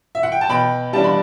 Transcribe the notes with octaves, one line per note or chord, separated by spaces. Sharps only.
E5
F#5
G5
A5
B2 G5 B5
G3 D4 A5
B5